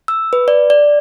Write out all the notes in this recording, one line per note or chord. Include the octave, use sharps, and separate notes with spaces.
E6
B4
D5
D5